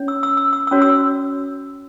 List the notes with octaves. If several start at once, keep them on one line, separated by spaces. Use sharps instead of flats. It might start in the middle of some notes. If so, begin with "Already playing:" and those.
Already playing: C#4 C#5
E6
E6
E6
E6
E6
C#4 F#4 C#5
E6